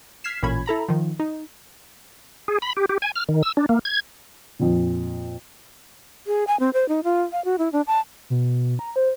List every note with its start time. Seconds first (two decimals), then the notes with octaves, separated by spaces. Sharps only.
0.24 F6 G#6 B6 C7 E7
0.43 A1 A#2 C#4 B5 G#6
0.66 E4 A4 A#5 B5
0.88 D#3 F3
1.20 D#4
2.48 G#4
2.62 B5
2.77 G4
2.89 G4
3.02 G#5
3.16 F6
3.29 D#3
3.43 E6
3.57 D4
3.69 A#3
3.85 G#6
4.59 F2 A#2
6.27 G#4
6.47 G#5
6.60 C4
6.73 C5
6.89 D#4
7.04 F4
7.32 F5
7.45 F#4
7.58 E4
7.73 D4
7.87 A5
8.30 B2
8.79 A#5
8.96 C5